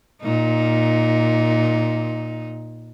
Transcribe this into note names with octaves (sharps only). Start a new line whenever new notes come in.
A#2 D#4